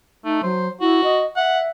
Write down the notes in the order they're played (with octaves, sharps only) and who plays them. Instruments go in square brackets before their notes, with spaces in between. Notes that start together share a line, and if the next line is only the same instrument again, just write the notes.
[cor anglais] A3 [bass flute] D#4
[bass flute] F#3 [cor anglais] C5
[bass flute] E4 [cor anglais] F#4
[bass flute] D#5
[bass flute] E5 [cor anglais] F#5